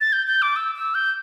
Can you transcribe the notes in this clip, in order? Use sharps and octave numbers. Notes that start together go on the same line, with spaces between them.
A6
G6
G6
D6
E6
E6
G6